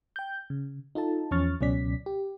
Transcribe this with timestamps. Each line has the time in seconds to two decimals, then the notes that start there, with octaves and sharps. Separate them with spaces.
0.16 G5 G6
0.50 C#3
0.95 D#4 F4 A4 A5
1.31 E2 F3 C#4 C#6 F6 A6
1.61 C#2 B2 F#3 C#4 D5 B6
2.06 G4